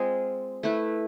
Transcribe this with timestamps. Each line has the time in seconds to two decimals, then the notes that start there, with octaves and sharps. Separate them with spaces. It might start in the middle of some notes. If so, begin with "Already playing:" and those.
Already playing: G#3 C4 F4 G#4
0.63 A3 E4 B4